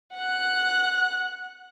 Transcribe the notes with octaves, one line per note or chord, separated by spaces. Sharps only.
F#5 F#6